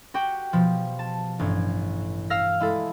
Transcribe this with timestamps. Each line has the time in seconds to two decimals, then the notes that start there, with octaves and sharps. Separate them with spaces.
0.14 F#4 G4 G5
0.53 B2 F3
0.99 A5
1.39 A1 G2 G#6
2.30 F5 E6 F6 A#6
2.60 G#3 E4 A4